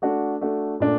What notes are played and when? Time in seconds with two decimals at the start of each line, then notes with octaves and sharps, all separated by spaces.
0.02 A3 D4 F#4
0.41 A3 D4 F#4
0.80 A#2 A3 D4